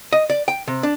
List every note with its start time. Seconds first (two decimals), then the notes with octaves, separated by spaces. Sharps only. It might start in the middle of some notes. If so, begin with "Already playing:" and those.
0.13 D#5
0.30 D5
0.48 G5
0.68 C3
0.83 D4